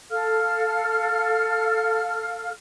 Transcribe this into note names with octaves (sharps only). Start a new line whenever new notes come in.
A4 F5 F6